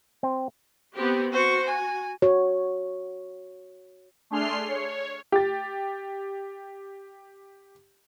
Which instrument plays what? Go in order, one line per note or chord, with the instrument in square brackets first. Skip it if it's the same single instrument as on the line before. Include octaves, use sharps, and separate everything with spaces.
[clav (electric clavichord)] C4
[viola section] B3 C4 G4
[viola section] F#4 [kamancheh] C5 C#6
[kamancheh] G#5
[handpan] F#4 C#5
[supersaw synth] A3 D4 G#4 C6 F6 C7
C#5
[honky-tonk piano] G4 A6